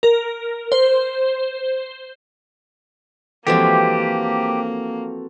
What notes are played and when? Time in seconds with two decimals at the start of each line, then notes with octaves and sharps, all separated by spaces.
0.03 A#4
0.72 C5
3.47 E3 F3 G#3 A#3 C4 F#4 G4 A4